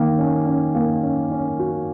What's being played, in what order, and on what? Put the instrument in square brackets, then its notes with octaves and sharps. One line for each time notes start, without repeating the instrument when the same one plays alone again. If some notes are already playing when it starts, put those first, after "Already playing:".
Already playing: [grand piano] D#3 A#3
C#4
C#4
A#3
C#4
C#4
F#4